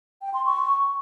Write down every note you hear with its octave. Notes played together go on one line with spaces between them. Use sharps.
G5
C6
C#6